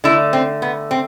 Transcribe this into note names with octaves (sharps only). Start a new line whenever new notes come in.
D3 A3 E4
C4
B3
C4